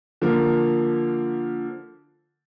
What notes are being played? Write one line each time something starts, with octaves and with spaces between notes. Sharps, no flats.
D3 F3 A#3